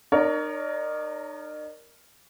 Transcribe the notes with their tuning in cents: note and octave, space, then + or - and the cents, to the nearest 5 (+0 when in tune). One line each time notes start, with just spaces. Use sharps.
D#4 -45 A#4 +0 C#5 +35